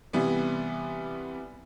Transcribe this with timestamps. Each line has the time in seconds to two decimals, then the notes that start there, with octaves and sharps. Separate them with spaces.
0.13 C3 E3 G3 B3